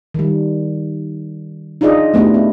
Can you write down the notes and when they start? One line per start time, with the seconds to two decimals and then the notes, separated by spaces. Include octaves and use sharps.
0.14 D#3 G3
1.81 D4 D#4 F4 G#4 D5 D#5
2.14 A3 B3 D4 E4 G4
2.34 B3